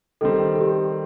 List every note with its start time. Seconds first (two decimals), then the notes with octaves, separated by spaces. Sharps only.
0.21 D#3 G3 C4 A4
0.55 A4
0.61 G4